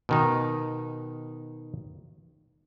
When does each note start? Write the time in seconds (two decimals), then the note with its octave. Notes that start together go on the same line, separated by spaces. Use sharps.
0.09 B2 D#3 D#4